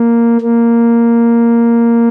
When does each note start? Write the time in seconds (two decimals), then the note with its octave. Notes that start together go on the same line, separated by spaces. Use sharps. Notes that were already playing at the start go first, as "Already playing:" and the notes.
Already playing: A#3
0.41 A#3